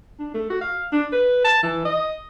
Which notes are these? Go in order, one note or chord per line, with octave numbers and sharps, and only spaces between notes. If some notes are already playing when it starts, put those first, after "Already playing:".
D4
A3
F#4
F5
D4
B4
A5
E3
D#5